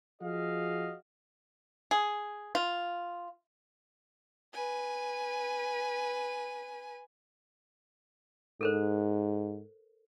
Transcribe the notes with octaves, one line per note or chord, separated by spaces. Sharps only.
F3 F#4 G#4 D#5 F5
G#4
F4
B4 G#5
G#2 A4 A#4 C5